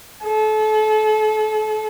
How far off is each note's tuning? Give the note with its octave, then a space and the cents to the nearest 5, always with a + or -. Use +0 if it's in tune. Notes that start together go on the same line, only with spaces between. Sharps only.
A4 -35